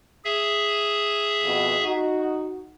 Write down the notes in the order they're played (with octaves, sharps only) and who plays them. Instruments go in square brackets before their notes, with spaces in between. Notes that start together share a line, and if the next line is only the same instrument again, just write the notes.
[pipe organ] G#4 E5
[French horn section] F2 B2
D#4 F#4